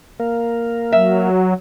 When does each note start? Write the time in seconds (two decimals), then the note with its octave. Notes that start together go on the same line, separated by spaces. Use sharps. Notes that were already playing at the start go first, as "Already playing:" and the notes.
0.20 A#3 A#4 F5
0.92 F#3 E5